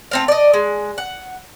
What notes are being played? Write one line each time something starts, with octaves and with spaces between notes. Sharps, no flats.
A3 C4 F5
D5 D#5
G#3
F#5